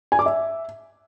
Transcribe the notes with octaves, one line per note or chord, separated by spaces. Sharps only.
G#5
D6
E5